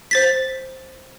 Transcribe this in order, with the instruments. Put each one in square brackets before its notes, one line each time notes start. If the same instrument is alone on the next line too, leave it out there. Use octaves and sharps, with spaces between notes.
[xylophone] C5 A6 B6